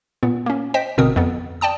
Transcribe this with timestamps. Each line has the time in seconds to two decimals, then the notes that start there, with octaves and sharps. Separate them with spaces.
0.23 A#2 B3
0.46 A#3 C#4
0.74 C5 D#5 G5 B6
0.98 G#1 B2 D3 C4 A#4 D#6
1.16 F2 B3
1.61 D5 G5 A5 D#6